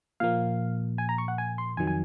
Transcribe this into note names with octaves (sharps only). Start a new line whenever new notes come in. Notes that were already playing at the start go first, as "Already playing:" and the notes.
A#2 F3 A#3 F5
G#5
A#5
C#6
F#5
G#5
C6
F2 D#3 F#3 G#5
G#5